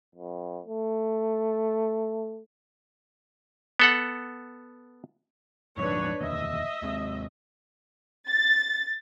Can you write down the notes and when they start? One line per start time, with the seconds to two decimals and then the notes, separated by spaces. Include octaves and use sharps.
0.15 F2
0.66 A3
3.80 B3 A4 F#5
5.78 A#1 F2 G#2 D4 B4 C#5
6.21 F1 D#2 D#5 E5
6.82 D#2 G#3 C4
8.29 A6